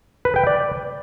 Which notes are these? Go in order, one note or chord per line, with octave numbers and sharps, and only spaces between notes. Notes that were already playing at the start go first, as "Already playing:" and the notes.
B4
G5
D5